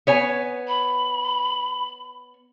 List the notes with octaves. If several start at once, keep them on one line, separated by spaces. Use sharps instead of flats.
B3 C#5 G#5
B5